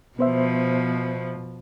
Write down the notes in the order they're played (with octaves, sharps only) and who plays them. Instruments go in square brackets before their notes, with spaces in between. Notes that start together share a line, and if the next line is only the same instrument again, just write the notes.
[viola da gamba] B2 F3 [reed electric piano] B3 C5 E5